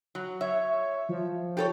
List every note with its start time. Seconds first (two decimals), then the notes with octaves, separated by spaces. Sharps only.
0.15 F#3
0.41 C#5 E5
1.09 F3
1.57 G4 A4 C#5